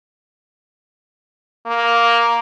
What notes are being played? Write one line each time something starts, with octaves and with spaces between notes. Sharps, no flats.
A#3